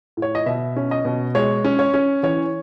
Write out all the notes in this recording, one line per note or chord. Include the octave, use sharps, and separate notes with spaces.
A2
C#5
D#5
B2 E5
C#4
D#5
B2
G#3 C#5
C#4
C#5
C#4
E3 C#5